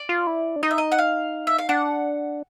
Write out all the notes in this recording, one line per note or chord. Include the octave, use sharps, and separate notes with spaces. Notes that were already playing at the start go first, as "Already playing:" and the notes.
Already playing: D5
F4
E4
D4
D#4 D#5
E5
D#5
F#5
F5
E5
F5
D4 F#5